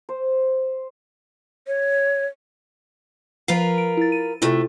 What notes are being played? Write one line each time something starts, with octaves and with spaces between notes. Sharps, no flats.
C5
C#5
F3 F4 A#4 B4 C7
D7
E4 A6
D#7
C3 A3 E4 F4 A4